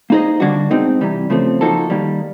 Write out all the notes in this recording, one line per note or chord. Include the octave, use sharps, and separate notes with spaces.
A#3 D#4 G#4 C5 D#5
D3 G3 A#3 D4 F#4
B2 G#3 C4 D#4
C3 E3 G3
C#3 F3 A3 C4
F3 A#3 D#4 F#4 A4
D#3 G3 A#3